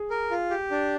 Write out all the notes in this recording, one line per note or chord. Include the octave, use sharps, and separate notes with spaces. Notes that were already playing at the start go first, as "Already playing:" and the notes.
Already playing: G#4 G#5
A#4
F4
G4
D4